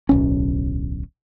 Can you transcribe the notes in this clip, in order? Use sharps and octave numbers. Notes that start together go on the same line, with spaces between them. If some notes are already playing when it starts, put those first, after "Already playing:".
D1 B1 C#4